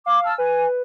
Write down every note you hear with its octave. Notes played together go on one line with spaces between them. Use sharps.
F5 D6
A5 E6 F6
B4 G#5